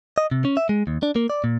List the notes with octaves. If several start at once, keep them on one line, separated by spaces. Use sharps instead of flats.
D#5
C3
C#4
E5
G#3
D#2
D4
A#3
D5
A#2